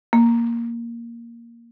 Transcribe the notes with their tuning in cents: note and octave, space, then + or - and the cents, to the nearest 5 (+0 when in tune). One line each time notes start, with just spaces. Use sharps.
A#3 +5